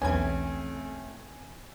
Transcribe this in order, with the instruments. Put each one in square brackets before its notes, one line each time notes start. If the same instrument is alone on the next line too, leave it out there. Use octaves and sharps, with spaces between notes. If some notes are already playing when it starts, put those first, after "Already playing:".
[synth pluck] B1 E2 G#6 [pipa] E3 C#4 [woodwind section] A3 C4 [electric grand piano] G#5